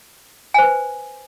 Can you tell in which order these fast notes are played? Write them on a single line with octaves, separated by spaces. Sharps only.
G#5 C5 B4